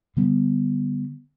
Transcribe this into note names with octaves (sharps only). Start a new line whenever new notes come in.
D3 G3 B3